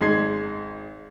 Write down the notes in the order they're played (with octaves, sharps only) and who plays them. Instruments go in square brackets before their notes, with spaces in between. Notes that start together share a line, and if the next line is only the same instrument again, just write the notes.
[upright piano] G#1 G#3 D#5 C6 G#6 C7